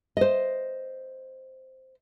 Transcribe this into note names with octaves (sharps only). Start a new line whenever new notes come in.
C5 D#5